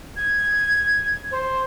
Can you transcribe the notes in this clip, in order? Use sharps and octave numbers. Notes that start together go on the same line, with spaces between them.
G#6
C5